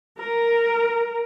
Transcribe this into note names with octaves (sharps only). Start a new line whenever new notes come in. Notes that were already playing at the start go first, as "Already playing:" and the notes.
A#4